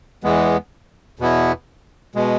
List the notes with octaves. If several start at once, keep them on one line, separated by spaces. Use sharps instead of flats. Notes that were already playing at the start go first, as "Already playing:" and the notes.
E2 E3 G#3 B3
E2 B2 B3 E4
B2 G#3